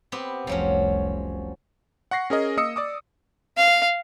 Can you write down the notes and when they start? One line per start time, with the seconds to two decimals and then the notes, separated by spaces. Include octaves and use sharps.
0.12 B3 C4 G4
0.47 F1 C2 F3 F#3 C#4
2.11 F#5 C#6 A#6 C7
2.30 C#4 G#4 A#4 D#5
2.57 A#3 D#5 D#6 E6 C#7
2.76 D5 D6 D#6
3.57 F5